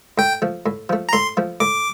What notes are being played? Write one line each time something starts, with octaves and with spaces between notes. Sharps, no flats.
A2 G5
F3 A3
A2
F3 A3
A#5
A2 C6
F3 A3
A2 D6